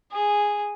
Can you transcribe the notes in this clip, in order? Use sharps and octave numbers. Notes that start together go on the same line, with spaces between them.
G#4